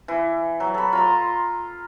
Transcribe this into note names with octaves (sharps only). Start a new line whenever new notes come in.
E3
F#3
A4 B5
F4 A#5 C6